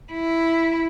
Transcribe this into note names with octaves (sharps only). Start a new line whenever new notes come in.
E4